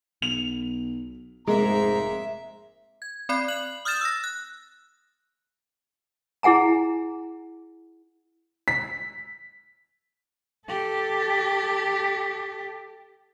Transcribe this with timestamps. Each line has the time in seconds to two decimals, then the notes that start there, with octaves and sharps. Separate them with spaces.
0.22 B1 F7
1.47 F1 G#2 G#3 A#3 E5 A#5
3.02 G#6
3.29 C4 D5 B5 F#6 C7
3.48 F#6 F#7
3.85 D#6 F6 G6 A6 E7
4.01 E6 A#6
4.24 F#6
6.43 E4 G#4 F#5 G#5 A#5
8.68 B6
10.67 G4 A4